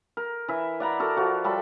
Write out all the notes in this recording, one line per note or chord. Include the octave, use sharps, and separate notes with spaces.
A#4
E3 E5
D5 F#5 A#5 B5
F#4 A4 A#4
F3 F#4
G3 A4 B5 C6